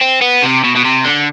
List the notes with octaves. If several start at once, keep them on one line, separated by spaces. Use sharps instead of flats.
C4
B3
C3
B2
B2
C3
D3